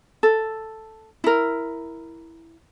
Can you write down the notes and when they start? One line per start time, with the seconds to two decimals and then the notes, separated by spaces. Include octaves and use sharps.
0.23 A4
1.24 E4 A#4